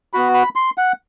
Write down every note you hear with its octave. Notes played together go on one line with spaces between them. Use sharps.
B3 F#4 B5
B5
C6
F#5